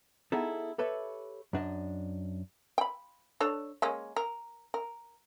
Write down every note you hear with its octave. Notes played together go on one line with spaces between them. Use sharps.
B3 D#4 E4 G#4 A4
G4 A4 B4 C#5 E5
F#2 D4 D#5
G5 B5
D4 A4 C#5
G#3 A#3 C#4
A#4
A#4